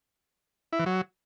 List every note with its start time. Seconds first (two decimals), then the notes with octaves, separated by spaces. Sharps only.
0.73 E4
0.79 E3
0.86 F#3